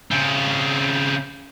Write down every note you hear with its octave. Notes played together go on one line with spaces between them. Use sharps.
C#3 C4